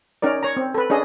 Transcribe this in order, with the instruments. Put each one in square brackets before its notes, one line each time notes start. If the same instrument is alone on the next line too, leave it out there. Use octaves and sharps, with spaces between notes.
[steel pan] C#4 D#4 A#4 D5
C#5 A#5
C4
A4 B4
C#4 D4 G#4 D#5